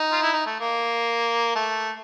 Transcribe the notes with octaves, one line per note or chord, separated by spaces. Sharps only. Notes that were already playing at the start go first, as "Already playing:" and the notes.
Already playing: D#4
F4
E4
D#4
A3
A#3
A3